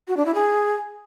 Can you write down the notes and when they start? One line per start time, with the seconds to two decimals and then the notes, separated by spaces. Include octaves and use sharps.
0.08 F#4
0.17 D4
0.26 E4
0.35 G#4